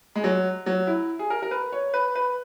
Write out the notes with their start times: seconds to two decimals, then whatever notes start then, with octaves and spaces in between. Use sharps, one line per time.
0.16 G#3
0.24 F#3
0.66 F#3
0.87 E4
1.19 G#4
1.30 A#4
1.42 A#4
1.51 B4
1.72 C#5
1.94 B4
2.15 B4